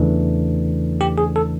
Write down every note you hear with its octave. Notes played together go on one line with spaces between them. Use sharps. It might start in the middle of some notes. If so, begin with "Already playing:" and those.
Already playing: E2 C#3 E3 A3 D4
G4
G#4
A4